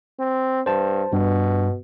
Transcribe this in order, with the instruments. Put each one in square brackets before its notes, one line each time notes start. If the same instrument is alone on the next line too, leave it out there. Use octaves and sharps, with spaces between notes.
[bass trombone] C4
[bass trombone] G2 [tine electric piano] C5 A5
[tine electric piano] G2 [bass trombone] B2